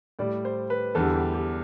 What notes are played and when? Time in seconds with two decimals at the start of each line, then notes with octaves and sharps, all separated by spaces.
0.19 A2 G3 D5
0.45 C5
0.70 B4
0.95 E2 D3 G3 A4
1.15 G4
1.34 G4